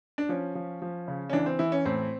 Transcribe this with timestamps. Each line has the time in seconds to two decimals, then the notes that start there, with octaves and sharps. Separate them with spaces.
0.18 D4
0.29 F3 C#4
0.55 F3
0.82 F3
1.08 C#3
1.30 C#4
1.33 E3 D4
1.46 C4
1.59 E3 E4
1.72 C#4
1.85 A2 C4